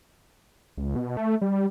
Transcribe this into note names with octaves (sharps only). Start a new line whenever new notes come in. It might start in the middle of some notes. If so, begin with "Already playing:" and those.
C#2
B2
A3
G3